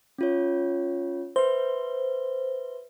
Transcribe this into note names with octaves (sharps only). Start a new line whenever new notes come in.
C#4 F4 C#5
B4 C5 E5